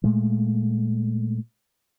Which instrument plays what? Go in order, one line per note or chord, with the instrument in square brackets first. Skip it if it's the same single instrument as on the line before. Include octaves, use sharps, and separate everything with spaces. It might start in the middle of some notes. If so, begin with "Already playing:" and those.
[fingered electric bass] A#2 G#3 A3